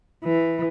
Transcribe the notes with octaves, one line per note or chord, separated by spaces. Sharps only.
E3